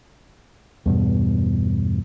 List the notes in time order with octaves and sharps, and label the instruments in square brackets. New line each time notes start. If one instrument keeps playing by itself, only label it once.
[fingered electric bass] E2 G2 B2